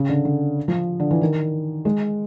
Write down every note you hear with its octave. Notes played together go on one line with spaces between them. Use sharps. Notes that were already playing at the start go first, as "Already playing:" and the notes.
Already playing: C#3
D3
D3
F3
D3
E3
D#3
G#3